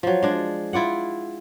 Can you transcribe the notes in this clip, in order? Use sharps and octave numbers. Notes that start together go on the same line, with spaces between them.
F3 F#3
G#3 D4
E4 F4 D5 F#5